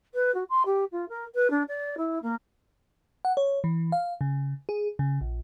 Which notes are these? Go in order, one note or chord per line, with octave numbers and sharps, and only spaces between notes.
B4
F#4
C6
G4
F4
A#4
B4
D4
D5
E4
A#3
F#5
C#5
E3
F5
C#3
G#4
C#3
A#1